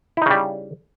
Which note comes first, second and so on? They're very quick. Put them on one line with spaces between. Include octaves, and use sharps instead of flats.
E4 D#4 C#3 G3